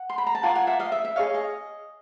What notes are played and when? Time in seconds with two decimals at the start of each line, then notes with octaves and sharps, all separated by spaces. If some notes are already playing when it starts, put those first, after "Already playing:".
Already playing: F#5
0.10 C6
0.18 B5
0.27 A#5
0.35 A5
0.43 F4 A#4 D5 F#5 G#5
0.55 F#5 G#5
0.67 E5 F#5
0.79 D#5 F5
0.92 E5
1.05 E5
1.16 G#4 C#5 D#5 F5
1.35 D#5